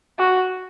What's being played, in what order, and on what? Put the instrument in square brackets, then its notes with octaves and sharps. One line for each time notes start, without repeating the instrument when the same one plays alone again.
[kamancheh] F#4